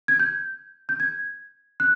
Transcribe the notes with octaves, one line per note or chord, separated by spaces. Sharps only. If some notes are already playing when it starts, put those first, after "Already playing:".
G#6
G6
G6
G#6
F#6